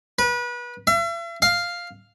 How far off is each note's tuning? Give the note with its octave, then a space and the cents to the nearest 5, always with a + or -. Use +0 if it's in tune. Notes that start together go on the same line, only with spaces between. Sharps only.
B4 -30
E5 +45
F5 +0